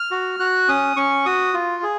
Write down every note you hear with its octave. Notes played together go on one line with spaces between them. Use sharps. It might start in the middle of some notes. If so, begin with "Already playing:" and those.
Already playing: F6
F#4
F#4 F#6
C#4 D#6
C#4 C#6
F#4 D#6
F4
G#4